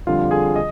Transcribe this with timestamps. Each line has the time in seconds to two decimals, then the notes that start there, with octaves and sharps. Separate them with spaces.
0.07 F2 D3 G3 F4 F5
0.31 G#4 G#5
0.56 D#5 D#6